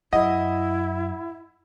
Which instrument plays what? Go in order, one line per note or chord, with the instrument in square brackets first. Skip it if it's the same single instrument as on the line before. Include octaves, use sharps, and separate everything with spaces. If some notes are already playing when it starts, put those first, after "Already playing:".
[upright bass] F#2 [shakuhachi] E4 [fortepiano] D#5 [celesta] F#5